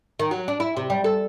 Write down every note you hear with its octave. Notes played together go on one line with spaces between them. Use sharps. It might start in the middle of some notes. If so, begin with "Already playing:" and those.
D#3
F#3
D4
E4
C3
G3
A4